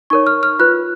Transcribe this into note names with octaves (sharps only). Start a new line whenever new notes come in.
D#4 A#4 C#5 C#6
F6
F6
F4 B4 F#6